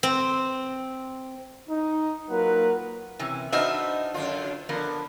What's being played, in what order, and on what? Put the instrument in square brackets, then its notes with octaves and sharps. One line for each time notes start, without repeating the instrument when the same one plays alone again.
[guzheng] C4
[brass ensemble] D#4
F#3 A#3 F4 A#4 B4 F#5
[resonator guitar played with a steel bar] C3 E3 C#4
[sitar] D4 D#4 [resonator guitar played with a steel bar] F#4 B4 E5 [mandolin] C5 D#5 F6
[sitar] F#2 D3 F4
[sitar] D3 [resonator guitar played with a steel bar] F3 B3 A#4